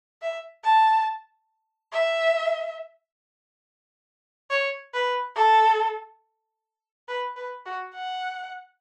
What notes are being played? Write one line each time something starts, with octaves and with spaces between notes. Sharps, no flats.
E5
A5
E5
C#5
B4
A4
B4
B4
F#4
F#5